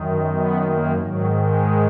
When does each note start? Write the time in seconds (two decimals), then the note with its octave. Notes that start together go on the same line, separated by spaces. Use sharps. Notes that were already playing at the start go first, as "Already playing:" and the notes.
Already playing: F#2 D#3
0.27 B3
0.61 A#3
0.95 G#2 D#3 F#3
1.30 G#3